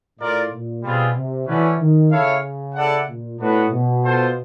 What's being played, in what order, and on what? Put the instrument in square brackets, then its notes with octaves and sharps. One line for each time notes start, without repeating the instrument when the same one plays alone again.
[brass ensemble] A2 [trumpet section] F4 A#4 D5
[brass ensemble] A#2
[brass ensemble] B2 [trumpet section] G3 C4 F4 G#4 B4
[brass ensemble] C3
[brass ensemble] E3 [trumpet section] A3 C#4 F#4 B4 D5
[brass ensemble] D#3
[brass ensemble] C#3 [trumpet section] E4 A4 C#5 F5
[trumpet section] E4 A4 D5 F#5
[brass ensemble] A#2
[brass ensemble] A2 [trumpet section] B3 D4 F#4 B4
[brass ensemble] B2
[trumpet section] F4 A4 C5